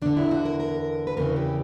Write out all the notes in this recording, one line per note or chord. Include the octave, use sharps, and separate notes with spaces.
E2 D3 D4
E4
F#4
A#4
A#4
B4
E2 C#3 E3 A#4
G4